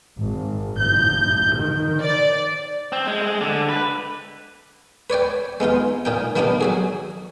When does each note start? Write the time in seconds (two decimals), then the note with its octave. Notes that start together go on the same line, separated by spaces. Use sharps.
0.18 G#1
0.81 G6
1.56 D#3
2.01 D5
2.92 C4
3.07 G#3
3.22 G#3
3.41 D3
3.69 B4
5.10 B4 C#5 D5 G5
5.60 G#3 B3 D#4 F4
6.05 A#2 D#4 G5
6.36 D#3 G3 A#3 B3 D4 D#4
6.61 F#3 F#4 G#4